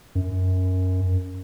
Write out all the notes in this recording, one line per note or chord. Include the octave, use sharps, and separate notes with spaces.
F#2